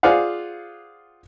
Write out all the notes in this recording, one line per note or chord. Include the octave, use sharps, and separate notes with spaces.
F4 G#4 C5 D5 F5 F#5